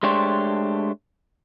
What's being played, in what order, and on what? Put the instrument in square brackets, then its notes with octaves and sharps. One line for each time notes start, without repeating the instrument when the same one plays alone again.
[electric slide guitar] G#3 A3 D4 G4 C5 C#5